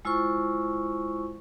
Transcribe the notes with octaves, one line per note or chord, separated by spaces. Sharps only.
G#3 E4 F4 C5 C#6